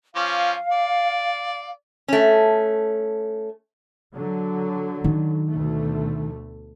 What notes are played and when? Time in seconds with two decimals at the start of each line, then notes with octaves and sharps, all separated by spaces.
0.16 F3 C#4 F5 D6
0.72 D5
2.08 A3 C#4
4.15 D3 F#3
5.04 D#3
5.49 D2 B2 A3